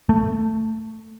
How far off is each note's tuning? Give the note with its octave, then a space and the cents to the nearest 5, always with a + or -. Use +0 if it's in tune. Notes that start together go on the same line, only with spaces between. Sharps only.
A3 +10